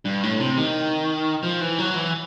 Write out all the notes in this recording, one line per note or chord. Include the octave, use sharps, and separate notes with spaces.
G2
A2
C3
D#3
F3
E3
F#3
E3